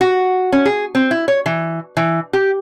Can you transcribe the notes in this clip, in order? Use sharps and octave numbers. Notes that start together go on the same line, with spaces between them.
F#4
C#4
G#4
C4
E4
C#5
E3
E3
G4